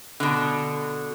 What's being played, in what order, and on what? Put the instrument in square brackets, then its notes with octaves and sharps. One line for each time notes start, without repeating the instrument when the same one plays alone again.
[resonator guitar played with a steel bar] B2 D3